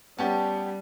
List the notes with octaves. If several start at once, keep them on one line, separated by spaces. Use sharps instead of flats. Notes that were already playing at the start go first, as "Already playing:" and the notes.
G3 B3 C#4 G4 A5